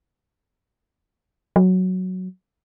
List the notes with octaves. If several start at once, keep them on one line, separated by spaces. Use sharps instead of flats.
F#3